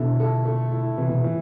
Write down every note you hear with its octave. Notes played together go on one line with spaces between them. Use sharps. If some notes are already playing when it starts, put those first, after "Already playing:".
Already playing: B2 D3 A3 E4
A4
A3
E4
C3 E3
B2
A2
E3